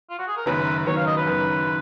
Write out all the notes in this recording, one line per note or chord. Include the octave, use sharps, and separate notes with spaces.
F4
F#4
G#4
A#4
F#1 F#2 D#3 F#3 B3 B4
F#1 F#2 D#3 F#3 B3 C#5
F5
D#5
B4
F#1 F#2 D#3 F#3 B3